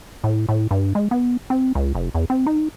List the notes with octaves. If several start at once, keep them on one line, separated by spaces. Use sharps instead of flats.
A2
A2
G2
G#3
B3
C4
C#2
F1
E2
C4
D#4